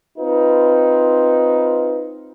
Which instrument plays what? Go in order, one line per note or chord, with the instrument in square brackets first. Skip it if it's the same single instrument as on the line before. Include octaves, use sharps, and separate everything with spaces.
[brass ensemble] C4 D#4 F4 B4